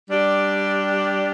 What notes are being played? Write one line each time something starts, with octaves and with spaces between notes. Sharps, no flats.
G3 D4 G4 D5